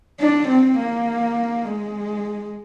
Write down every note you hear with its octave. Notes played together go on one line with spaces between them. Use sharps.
D4
C4
A#3
G#3